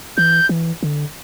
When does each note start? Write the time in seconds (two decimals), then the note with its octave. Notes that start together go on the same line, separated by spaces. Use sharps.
0.17 E3 G6
0.49 E3
0.83 D3